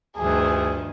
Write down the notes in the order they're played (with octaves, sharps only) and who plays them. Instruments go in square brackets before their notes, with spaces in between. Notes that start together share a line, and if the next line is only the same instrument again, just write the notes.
[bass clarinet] D2 [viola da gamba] G2 D#3 F3 [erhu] G#4